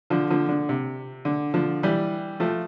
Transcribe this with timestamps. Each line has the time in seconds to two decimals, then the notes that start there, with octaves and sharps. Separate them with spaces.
0.10 D3 F3
0.30 D3 F3
0.49 D3
0.69 C3
1.25 D3
1.54 D3 F3
1.83 E3 G3
2.40 F3 A3